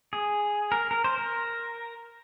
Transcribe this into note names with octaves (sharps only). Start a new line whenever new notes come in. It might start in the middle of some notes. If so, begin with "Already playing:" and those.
G#4
A#4
A#4
C5
A#4